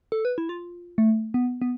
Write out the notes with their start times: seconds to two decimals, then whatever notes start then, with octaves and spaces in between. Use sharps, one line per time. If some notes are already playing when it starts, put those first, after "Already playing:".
0.12 A4
0.25 B4
0.38 E4
0.49 F4
0.98 A3
1.34 B3
1.62 B3